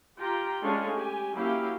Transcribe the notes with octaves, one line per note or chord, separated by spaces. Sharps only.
F4 G4 G5 A#5
G#3 A3 C#4 D4 C#5 F5
G4 G#5
F#3 A#3 C#4 E4 G4 F5